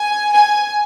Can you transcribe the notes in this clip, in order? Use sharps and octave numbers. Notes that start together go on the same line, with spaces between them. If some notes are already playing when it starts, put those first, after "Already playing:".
Already playing: G#5
G#5